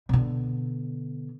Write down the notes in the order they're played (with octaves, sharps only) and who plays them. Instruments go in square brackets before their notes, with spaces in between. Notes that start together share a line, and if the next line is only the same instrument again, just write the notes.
[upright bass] B2 D3